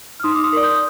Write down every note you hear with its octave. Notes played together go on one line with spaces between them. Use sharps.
F6
D#4 C6 D#6
D6
C6 D#6
A#4 D5
D#6 G6